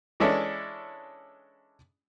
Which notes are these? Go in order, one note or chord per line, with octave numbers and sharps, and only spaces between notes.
E3 G#3 C#4 D4 E4 A4